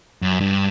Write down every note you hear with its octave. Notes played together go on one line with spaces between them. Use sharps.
F#2
G2